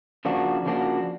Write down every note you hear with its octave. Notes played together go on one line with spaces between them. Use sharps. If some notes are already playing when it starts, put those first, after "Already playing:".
C#3 F3 A#3 D4 F#4
C#3 F3 A#3 D4 F#4